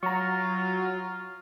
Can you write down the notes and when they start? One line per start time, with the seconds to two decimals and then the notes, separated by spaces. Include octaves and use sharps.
0.03 F#3 F4 A#5 C#6